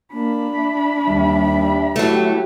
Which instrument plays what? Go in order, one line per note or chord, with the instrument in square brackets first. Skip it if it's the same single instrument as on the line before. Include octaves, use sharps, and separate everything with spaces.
[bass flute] A#3 [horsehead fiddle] D4 B5
[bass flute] E5
[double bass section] D#2 G3
[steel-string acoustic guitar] F#3 A3 [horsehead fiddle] E4 G4